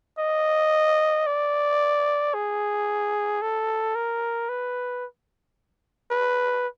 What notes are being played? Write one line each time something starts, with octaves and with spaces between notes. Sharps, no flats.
D#5
D5
G#4
A4
A#4
B4
B4